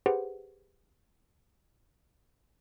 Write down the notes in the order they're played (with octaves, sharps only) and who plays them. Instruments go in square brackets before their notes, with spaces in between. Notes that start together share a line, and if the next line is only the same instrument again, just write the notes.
[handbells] G4 G#4 B4 C5 F#5